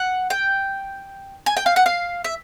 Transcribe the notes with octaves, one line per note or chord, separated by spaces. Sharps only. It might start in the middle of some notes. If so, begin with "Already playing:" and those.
Already playing: F#5
G5
G#5
G5
F5
F#5
F5
E5